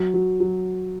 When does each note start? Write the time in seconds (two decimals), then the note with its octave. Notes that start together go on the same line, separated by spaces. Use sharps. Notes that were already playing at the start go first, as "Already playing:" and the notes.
Already playing: F#3
0.14 F#3
0.40 F#3